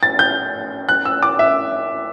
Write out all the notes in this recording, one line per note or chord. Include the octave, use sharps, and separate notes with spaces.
A6
G6
F#6
E6
D6
E5